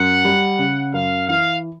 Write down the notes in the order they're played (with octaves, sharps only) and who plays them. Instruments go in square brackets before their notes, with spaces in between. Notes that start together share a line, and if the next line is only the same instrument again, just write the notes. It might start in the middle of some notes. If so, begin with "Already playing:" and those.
Already playing: [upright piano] F#2 [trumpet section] F#5
[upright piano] G3
C#3
[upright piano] F#2 [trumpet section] F5
[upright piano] E3 [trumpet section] F5